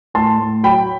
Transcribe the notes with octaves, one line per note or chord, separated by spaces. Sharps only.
A2 A5 C6
A2
F#3 G5 B5